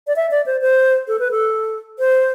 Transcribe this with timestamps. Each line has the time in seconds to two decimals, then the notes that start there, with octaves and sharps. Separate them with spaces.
0.07 D5
0.16 E5
0.31 D5
0.46 C5
0.61 C5
1.08 A4
1.19 B4
1.31 A4
1.99 C5